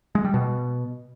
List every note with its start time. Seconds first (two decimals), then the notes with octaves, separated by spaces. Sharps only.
0.15 G#3
0.24 G3
0.34 B2